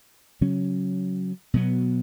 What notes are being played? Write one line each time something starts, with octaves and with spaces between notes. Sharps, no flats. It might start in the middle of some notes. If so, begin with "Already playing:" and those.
C#3 F#3 C#4
B2 F#3 B3